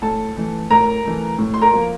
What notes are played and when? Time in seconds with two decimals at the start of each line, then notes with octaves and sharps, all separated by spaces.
0.02 A2 A4 A5
0.37 E3 A3
0.70 A2 A#4 A#5
1.05 E3 A3
1.39 A2
1.54 C6
1.62 A#4 A#5
1.73 F3 A#3